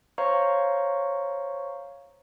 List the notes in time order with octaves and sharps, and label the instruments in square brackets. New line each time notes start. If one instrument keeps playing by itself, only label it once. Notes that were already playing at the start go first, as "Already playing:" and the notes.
[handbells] C5 C#5 F5 A#5 C#6